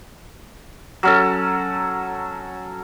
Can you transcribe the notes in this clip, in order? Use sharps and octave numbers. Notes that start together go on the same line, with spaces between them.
F#3 C#4 A4